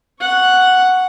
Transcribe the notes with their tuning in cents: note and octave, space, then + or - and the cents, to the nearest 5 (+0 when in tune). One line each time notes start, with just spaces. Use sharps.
F#5 +0 C#6 +0